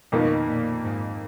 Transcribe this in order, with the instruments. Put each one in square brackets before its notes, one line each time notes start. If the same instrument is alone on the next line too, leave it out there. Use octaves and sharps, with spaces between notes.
[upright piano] F2 D#3 A#3 D#4 [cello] B2
[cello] A#2
G#2